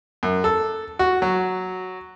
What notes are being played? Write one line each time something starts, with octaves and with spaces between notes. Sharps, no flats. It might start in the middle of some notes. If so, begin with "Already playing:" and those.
F#2
A4
F#4
F#3